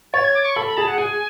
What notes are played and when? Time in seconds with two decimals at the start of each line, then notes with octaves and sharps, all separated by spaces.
0.13 C#5 A6
0.24 G#6
0.34 D6
0.45 C#6
0.56 A4 B5
0.67 B5
0.77 G#4 A5
0.87 F#5
0.98 G#4 G#5